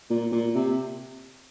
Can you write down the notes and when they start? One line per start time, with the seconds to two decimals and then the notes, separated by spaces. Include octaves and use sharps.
0.10 A#2
0.32 A#2
0.55 C3